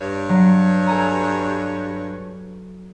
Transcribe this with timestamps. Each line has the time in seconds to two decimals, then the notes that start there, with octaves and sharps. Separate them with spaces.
0.01 G2 C#5
0.29 F#3
0.87 A4 G#5 A#5